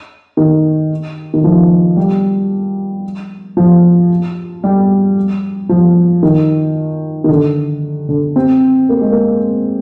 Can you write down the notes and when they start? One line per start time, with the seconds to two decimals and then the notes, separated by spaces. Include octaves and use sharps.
0.37 D#3
1.34 D#3
1.44 F3
1.97 G3
3.57 F3
4.64 G3
5.69 F3
6.23 D#3
7.24 D#3
7.29 D3
8.09 D3
8.36 C4
8.89 A#3
9.01 G#3
9.12 A#3